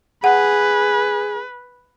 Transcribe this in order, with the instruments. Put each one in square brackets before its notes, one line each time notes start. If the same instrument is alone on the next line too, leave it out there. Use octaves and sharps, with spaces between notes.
[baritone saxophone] G#4 [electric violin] B4 [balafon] F#5